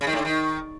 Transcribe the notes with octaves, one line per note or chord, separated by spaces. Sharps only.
C#3
D#3
A2
D3
D#3